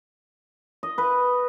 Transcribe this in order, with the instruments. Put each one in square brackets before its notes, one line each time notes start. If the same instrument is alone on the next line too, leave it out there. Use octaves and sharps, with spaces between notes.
[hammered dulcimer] D#5
B4